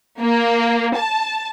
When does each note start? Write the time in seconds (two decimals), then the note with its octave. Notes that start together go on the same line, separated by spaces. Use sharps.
0.20 A#3
0.97 A5